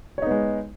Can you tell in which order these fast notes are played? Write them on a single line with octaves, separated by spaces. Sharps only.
C#5 D#4 B3 G#3